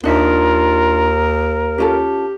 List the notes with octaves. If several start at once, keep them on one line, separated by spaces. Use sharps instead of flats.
D#2 D4 D#4 F4 A#4 E5
C#4 F4 G4 A4